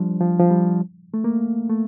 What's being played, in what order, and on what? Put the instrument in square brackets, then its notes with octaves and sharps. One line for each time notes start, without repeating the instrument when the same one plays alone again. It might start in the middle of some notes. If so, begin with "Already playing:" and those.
Already playing: [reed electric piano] F3 G3 D4
F3
F3
G3
A3
A#3
A3